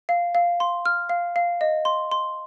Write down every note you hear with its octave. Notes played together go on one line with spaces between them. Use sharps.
F5
F5
C6
F6
F5
F5
D#5
C6
C6